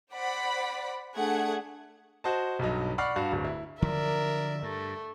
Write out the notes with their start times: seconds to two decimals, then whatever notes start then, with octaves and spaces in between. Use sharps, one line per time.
0.13 C5 D5 F#5 B5
1.17 A3 D4 G#4 F#5 G#6
2.24 F#4 C5 D#5 A5
2.59 B1 G2 F#3 D#4
2.98 D5 F#5 B5 C#6 F6 C7
3.16 G2 F#4 F5
3.32 D1 G2
3.45 E4
3.82 D3 F3 F#3 A#4 D5 E5
4.63 G2 A3